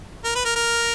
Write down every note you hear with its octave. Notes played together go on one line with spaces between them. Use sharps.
A#4
B4
A#4
A#4